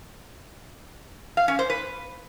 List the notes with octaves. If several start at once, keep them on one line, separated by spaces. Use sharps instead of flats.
F5
C#4
C5
B4